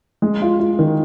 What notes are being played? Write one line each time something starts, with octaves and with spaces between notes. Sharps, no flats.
G#3
F4
F4
D#3